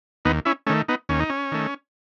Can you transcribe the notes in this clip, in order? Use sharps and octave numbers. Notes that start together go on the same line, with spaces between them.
D#2 B3 D#4
C#4 E4
D#3 A3 C#4
B3 D#4
D#2 C#4
D#4
C#4
D#3 A3